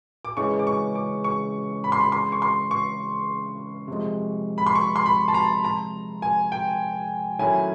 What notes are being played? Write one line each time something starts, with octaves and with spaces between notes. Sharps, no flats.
D6
C#3 E3 G#3 C#4 C#6
D6
C#6
D6
C#6
B5
C6
B5
C6
C#6
C6
C#6
C3 F3 G#3
B5
C6
C#6
C6
B5
A5
A#5
A#5
G#5
G5
D#3 F#3 A3 C#4 E4 G#5